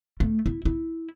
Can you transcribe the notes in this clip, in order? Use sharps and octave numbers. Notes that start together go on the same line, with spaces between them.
A3
E4
E4